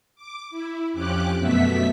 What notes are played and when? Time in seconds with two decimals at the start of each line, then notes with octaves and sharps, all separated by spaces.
0.15 D6
0.50 E4
0.93 F2 F3 C#4 G4 D6 F#6
1.38 F#2 B2 A3 B3 E5 B6